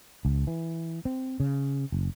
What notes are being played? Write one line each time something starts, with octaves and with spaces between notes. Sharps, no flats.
C#2
E3
C4
C#3
F#1